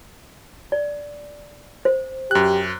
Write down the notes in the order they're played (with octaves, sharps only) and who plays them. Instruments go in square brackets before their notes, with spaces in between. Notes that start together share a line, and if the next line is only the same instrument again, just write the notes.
[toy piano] D5
C5
[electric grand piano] F#2 F#6 [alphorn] G4